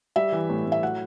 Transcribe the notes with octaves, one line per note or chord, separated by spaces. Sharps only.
G3 E5
E3
A2
A2
E5
F#3 F#5